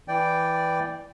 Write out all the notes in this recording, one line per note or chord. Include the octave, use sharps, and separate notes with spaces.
E3 D5 G5